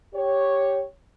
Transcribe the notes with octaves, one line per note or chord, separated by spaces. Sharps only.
G4 C#5